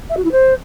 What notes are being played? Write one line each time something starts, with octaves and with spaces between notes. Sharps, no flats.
E5
F#4
E4
C5